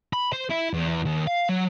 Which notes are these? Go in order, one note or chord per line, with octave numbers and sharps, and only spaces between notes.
B5
C5
E4
E2
D#2
F5
F#3